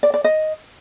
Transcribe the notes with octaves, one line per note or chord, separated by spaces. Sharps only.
D5
D5
D#5